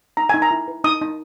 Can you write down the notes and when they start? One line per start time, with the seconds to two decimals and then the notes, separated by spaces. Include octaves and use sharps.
0.17 D#4 A#5
0.29 D#4 G#5
0.42 A#5
0.51 E4
0.68 B4
0.84 D#4 D#6
1.01 D#4